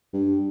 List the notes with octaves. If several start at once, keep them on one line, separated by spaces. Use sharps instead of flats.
G2